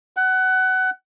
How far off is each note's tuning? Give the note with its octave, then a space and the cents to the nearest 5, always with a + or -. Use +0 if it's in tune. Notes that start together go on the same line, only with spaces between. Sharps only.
F#5 +20